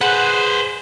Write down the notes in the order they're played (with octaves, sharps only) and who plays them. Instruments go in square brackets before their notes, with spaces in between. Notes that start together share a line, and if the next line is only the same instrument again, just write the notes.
[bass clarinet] G#4 [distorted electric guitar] B4 C5 [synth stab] F#5